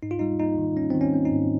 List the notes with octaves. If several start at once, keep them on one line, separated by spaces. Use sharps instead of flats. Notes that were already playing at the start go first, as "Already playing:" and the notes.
G#2 D#4
F4
G3 D#4
A#3 D#4
D#3
G3 C#4
D#3 C4
C#4
A#3
D#4
G#2